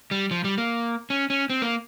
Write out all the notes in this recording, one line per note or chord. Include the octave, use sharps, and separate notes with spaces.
G3
F3
G3
A#3
C#4
C#4
C4
A#3